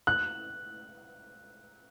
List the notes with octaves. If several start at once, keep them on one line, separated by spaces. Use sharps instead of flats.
F#6